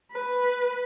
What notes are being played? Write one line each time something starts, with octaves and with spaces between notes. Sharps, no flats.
B4